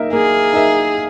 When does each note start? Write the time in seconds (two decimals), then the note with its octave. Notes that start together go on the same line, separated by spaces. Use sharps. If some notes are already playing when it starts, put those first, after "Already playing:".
Already playing: A#3 D#4 A#4 E5
0.13 A#3 G#4
0.53 D#4 A#4 E5